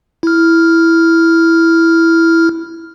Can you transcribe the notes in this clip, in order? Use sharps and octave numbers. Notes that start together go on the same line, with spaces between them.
E4 F6